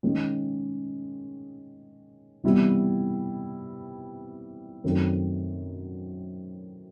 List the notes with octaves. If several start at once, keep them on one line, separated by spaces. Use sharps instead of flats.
D#3 G#3 C#4
C3 E3 G3 B3 E4
F#2 D#3 F#3 A3 C4